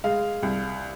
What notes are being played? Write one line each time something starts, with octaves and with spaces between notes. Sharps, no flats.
G#3 F5
C2